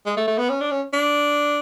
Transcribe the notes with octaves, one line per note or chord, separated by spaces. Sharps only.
G#3
A3
A3
B3
C#4
D4
C#4
D4